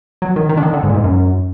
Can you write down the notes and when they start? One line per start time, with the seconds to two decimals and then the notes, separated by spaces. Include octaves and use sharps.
0.22 F#3
0.36 D#3
0.49 D#3
0.57 D3
0.63 D#3
0.73 D3
0.83 G#2
0.89 A#2
0.94 G#2
1.04 F#2